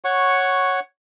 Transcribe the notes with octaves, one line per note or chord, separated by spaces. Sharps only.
C#5 F#5 C#6